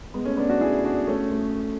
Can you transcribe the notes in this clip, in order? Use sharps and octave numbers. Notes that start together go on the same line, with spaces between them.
G#3 B3
A3 C#4
B3 D4
D4 F#4
E4 G#4
D4 F#4
A3 C#4
A3